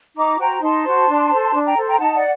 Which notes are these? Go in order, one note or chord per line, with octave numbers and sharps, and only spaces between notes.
D#4 A#5 D6
F#4 C5 G5 A#5
D#4 A5 C6
F#4 C5
D4
A4 C5
D4
G5 A#5
A4 C5
G5 A#5
D#4 F#5 A5
D5 F#5